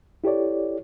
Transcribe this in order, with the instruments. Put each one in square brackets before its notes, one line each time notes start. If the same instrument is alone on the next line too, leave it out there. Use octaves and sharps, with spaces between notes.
[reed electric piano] E4 G4 A4 C#5 D5